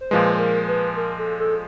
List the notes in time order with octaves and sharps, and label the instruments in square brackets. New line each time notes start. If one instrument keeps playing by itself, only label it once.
[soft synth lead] C5
[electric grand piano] A#2 F3 G#3 [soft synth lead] B4
[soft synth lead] A#4
B4
A#4
A4
A4